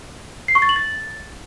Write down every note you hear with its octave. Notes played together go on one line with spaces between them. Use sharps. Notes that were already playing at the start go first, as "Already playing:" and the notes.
C7
C#6
A6
F#7
A6